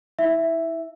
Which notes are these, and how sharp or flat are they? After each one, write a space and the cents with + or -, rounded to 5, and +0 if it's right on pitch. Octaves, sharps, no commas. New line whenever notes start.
E4 -30 E5 +0